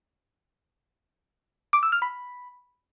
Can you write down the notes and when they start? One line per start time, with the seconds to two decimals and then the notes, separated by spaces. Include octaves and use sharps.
1.73 D6
1.83 E6
1.92 F6
2.02 B5